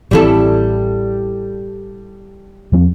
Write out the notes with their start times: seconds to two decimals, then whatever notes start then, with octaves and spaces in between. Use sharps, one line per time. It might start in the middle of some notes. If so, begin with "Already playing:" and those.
0.11 A1 E3 G3 C4 E4 A4
2.72 E2 F3 C4